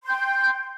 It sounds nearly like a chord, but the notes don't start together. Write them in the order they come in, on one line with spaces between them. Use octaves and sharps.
C6 G6 G5